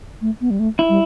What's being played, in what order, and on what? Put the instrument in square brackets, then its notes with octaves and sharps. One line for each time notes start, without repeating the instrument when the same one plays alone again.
[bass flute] A3
B3
G3
A3
[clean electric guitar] E4
[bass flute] G3